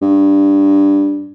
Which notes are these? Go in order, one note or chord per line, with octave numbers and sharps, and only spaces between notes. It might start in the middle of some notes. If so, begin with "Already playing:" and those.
G2